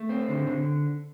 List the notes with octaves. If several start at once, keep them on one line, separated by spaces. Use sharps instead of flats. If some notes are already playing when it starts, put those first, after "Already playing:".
Already playing: A3
C4
D3
D3